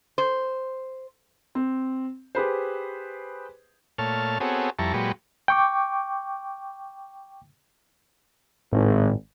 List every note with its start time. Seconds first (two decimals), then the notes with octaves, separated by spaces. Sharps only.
0.18 C5
1.55 C4
2.35 G4 G#4 B4 C5
3.98 A#2 A3 C#5 A5 F6
4.40 B3 C4 F#4 G#4 A4 C#5
4.79 F2 G3 E4 A5 A#5 C#6
4.94 A#2 F#3 G#3 G4 B4 C#6
5.48 G5 C#6 D6
8.73 G#1 A2